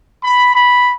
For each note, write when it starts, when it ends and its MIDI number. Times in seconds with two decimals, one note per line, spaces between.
0.23 0.52 83
0.53 0.95 83